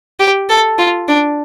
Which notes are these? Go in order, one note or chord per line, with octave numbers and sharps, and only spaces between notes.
G4
A4
F4
D4